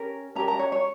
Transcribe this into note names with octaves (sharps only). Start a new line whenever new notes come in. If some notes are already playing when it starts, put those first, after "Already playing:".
Already playing: C#4 G4 A#4
C#4 G4 A#4 A#5
A#5
C#5
C#5